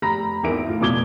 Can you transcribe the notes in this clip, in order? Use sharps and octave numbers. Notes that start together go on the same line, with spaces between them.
F1 G4 A#5 B5 A#6
G#1 E2 E4 A#4 D7
A2 F4
F1 B2 F4 D6 G#6 G7